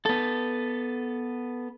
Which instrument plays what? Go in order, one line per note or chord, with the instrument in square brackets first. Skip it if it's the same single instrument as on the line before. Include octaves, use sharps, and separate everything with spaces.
[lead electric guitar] B3 A4